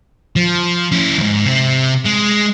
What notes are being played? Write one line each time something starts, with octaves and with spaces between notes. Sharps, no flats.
F3
C#4 E4
E2 G#2
C3 C4
G#3